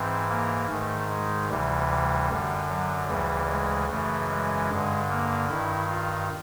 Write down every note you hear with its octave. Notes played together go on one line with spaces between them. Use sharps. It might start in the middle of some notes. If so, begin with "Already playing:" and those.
Already playing: G#2 E3 C4
A#3
G#2 D#3 A3
G#3
D2 C3 E3 G3
G3
F#2 D3
F#3
D2 C#3 E3 G3
G#3
F#2 C#3 E3 A3
G#3
G2 D3
A#3
G2 D#3 E4
F4